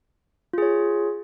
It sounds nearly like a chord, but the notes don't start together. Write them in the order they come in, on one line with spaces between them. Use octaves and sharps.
F4 G#4 C#5